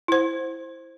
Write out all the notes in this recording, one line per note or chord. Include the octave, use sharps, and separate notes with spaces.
E4 C5